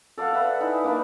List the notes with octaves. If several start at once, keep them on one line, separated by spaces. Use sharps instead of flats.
A4 D5 F5 F#5
B4 E5 F#5
D#4 E4 G#5
A#3 D4 B4